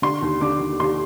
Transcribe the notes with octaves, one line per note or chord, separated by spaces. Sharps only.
D3 C6
D#2
D3 D6
D#2
D#2 C6